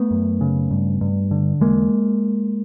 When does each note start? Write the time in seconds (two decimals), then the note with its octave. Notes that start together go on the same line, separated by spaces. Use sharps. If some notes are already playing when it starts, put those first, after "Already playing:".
Already playing: A3 B3
0.11 F#2
0.41 C#3
0.71 G2
1.01 G2
1.31 D3
1.61 E2 G#3 A#3